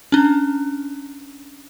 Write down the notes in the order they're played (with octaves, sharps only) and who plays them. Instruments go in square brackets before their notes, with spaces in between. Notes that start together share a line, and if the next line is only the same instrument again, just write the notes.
[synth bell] C#4 D4